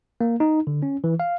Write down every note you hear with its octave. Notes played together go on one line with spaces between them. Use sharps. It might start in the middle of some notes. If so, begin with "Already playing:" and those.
A#3
D#4
D3
C#4
E3
F5